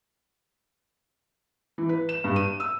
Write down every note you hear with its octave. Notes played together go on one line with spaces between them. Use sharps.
E3
B4
E7
G2
D#7
E6